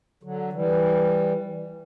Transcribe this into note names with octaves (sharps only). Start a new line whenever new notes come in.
D3 F#3
E3 G3